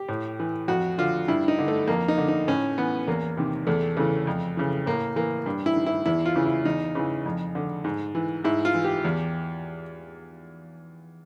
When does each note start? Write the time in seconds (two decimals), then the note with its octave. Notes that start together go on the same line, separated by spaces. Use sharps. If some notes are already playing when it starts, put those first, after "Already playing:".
Already playing: G4
0.08 A2
0.39 E3
0.68 F2 F#4
0.98 D3 F4
1.28 G2 E4
1.48 D#4
1.59 D3
1.68 A3
1.88 F2 A#3
2.08 D#4
2.18 D3
2.28 D#4
2.48 A2 C#4
2.78 E3 B3
3.08 E2 A#3
3.37 C3 D#3
3.67 E2 A3
3.97 C#3 E3 A3
4.27 F2
4.57 C#3 E3
4.86 A2 A#3
5.16 E3 A#3
5.46 G2
5.66 E4
5.76 D#3
5.86 E4
6.06 E2 E4
6.26 F4
6.36 C#3 E3
6.46 E4
6.65 E2 D#4
6.95 C#3 E3
7.26 F2
7.55 D3
7.84 G#2
8.15 E3
8.44 G#2 E4
8.65 F4
8.75 E3
8.84 G4
9.05 E2